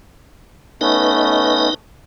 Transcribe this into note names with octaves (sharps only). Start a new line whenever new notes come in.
A3 B3 C#4 D#4 B4 D#5